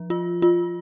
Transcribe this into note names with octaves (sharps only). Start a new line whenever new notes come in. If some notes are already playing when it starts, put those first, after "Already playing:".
Already playing: F3
F4
F4